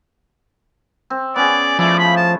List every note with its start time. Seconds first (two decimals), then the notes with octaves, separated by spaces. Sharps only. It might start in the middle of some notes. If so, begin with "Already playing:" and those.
1.10 C4
1.36 B3 C#4 G#4 D5
1.79 F3 A3 E4 D5
1.99 B5
2.17 A5